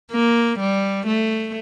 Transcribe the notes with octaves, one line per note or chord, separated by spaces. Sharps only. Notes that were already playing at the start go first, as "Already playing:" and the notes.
A#3
G3
A3